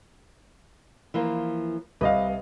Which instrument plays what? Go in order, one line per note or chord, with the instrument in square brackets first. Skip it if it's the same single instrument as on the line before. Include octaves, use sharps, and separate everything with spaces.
[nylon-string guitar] E3 F3 A#3
[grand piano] C2 D#5 F5 [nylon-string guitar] B4